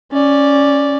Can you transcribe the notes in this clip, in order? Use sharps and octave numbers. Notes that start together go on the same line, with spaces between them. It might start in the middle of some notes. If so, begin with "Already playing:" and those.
C#4 D5